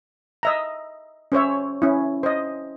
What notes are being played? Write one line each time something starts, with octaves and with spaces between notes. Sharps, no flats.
D#5 E5 A#5
C#4 C5 C#5 E5
C#4 E4
C5 D#5